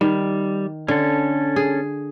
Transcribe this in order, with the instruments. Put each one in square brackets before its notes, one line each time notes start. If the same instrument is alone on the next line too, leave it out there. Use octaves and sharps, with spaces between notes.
[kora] D#3 [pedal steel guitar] G3
[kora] D3 [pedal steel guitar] C#4 A4
[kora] G#4